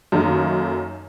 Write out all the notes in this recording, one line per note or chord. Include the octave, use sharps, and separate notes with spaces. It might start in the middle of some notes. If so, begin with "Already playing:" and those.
F#2 D#3 A3 A#3 D#4